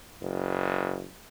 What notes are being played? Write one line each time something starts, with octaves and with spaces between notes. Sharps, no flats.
F#1